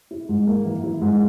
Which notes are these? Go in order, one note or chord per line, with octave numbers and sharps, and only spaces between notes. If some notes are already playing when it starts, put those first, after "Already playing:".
E4
G#2
A#3
E3
E4
G#2